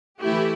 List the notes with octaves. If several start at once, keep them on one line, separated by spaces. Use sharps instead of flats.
E3 A3 E4 G4